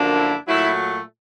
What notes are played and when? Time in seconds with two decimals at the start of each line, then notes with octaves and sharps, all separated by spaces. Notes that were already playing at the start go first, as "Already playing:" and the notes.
Already playing: F#2 D3 F3 A#3 D4
0.14 E4
0.47 A#2 F#3 A3 E4